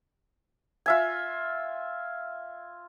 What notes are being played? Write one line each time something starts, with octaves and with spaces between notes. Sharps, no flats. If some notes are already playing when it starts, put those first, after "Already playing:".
F4 E5 G#5